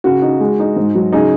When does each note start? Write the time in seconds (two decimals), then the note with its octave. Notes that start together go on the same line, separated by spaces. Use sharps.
0.04 C#3 F#4
0.22 D#4
0.40 G#3
0.59 D#4
0.76 G#2
0.95 F#3
1.13 C#3 D#4 G#4